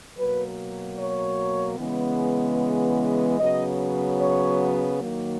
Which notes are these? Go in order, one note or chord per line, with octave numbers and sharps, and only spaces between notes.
B2 F#3 A#3 B4
C#5
C#3 E3 G#3 B3
C#3 F#3 B3 D#5
C#5
D#3 F#3 A#3